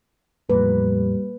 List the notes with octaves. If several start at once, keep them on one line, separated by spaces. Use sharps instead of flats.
E2 A2 F3 G3 A#3 B4